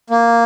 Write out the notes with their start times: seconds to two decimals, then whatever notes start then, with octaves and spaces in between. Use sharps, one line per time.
0.10 A#3